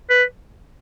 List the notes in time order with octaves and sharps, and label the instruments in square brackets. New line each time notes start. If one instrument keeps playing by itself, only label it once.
[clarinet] B4